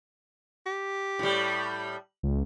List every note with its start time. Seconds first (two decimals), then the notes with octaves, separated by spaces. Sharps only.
0.66 G4
1.19 A2 G3
2.23 C#2